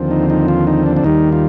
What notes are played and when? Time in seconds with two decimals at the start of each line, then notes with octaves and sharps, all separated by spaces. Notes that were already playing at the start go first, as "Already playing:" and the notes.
Already playing: D#2 D3 F3 C4
0.11 D#4
0.30 D#4
0.48 F4
0.67 D#4
0.86 D4
0.97 D4
1.04 D#2 D#3 G3 D#4
1.32 F4